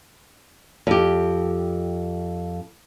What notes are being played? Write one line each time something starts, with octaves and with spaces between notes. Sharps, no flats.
F2 G4